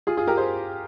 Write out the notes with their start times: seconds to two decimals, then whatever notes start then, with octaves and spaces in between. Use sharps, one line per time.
0.07 F4 G#4
0.17 F4 G#4
0.27 G4 A#4
0.37 G#4 C5